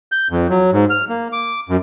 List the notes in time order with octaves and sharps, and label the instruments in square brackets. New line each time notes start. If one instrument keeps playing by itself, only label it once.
[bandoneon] G6
F2
F#3
G#2
F6
A#3
D6
F#2